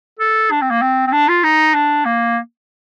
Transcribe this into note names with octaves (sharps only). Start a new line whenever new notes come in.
A4
D4
C4
A#3
C4
C4
D4
F4
D#4
D4
A#3